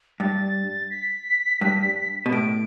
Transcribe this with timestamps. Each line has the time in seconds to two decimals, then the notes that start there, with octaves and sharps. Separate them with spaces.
0.20 G2 A6
0.90 B6
1.61 G2
2.26 B2
2.32 A2 D7